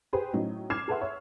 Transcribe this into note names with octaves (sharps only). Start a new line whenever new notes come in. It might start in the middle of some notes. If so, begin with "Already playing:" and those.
G4 G#4 B4 C5
A2 F#3 C#4 D#4
D6 F6 G#6 C7 E7
G#4 A4 B4 E5 F#5 C6
C#5 E5